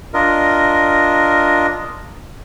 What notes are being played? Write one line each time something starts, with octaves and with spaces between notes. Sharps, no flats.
D4 F4 A#4 D#5